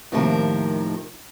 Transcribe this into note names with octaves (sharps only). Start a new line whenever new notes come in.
D#2 A2 C3 D#3 F3 A#4